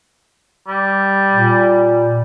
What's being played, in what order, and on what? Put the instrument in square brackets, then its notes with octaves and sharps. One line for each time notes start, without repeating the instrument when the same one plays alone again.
[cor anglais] G3
[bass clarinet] A#2